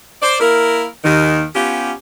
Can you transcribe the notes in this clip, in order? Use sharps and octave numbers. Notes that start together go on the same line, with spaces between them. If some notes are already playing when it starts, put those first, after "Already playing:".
C5 D5
A#3 E4 A#4
D#2 D#3
B3 C#4 F4 G4